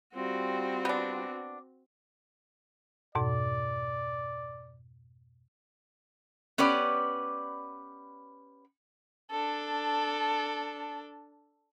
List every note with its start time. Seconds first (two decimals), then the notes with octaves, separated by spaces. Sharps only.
0.15 G3 C4 F4 F#4
0.85 B3 D4
3.15 F2 G#2 B2 D5
6.58 B3 C#4 G4 B4 D5
9.30 D4 A4